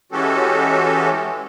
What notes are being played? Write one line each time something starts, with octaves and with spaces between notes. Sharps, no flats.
E3 G#3 C#4 F#4 G4 A4